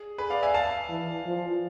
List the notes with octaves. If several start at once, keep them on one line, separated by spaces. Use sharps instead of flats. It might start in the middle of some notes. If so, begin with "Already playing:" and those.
Already playing: G#4
G#4 B4
D5 F5
E5 G#5
F5 A5
E3
F3